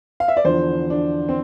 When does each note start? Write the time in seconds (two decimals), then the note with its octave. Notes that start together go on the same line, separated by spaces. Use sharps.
0.20 F5
0.28 E5
0.37 D5
0.45 E2 D3 F3 C5
0.90 D4
1.29 C4